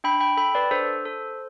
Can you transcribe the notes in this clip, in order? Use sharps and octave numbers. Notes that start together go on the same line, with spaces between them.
D4 G5 B5
G5 B5
A4 G5 B5
B4 D5
D4 A4 C5
A4